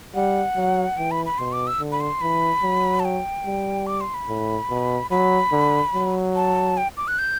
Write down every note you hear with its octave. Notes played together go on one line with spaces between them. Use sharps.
G3 F#5
F#3
E3 G5
B5
B5
B2 C6
D6
E6
D3
B5
C6
E3 B5
F#3
A5
G5
G3
D6
C6
B5
A2
B2
F#3 B5
D3
F#3
A5
G5
D6
F#6
G6